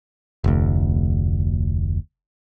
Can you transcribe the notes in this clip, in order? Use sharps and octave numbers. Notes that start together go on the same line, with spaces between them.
F1 D2